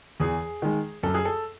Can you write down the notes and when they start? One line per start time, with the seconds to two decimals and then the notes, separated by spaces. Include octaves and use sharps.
0.20 E2 G#4
0.62 D#3 G#3
1.03 F#2 A4
1.14 G#4
1.25 A4